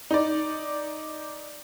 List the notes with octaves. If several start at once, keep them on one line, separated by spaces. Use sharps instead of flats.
D#4 D5